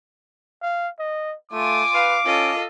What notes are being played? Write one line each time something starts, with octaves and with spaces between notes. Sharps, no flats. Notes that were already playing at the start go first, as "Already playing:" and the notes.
F5
D#5
A3 F4 G#5 D6
B4 F5
C#4 F4 A4 D#5